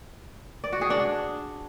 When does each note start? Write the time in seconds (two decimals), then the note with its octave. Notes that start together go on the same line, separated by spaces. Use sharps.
0.64 D5
0.72 F#4
0.81 G#4
0.90 D4